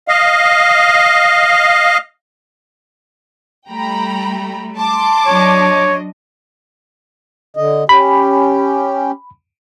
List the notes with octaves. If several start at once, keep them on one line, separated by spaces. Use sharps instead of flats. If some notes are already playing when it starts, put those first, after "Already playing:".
D#5 F5
G3 A3 G5 A#5 B5
A5 C6 D6
F#3 D4 C#5 D#5
D3 D#5
C#4 G4 B5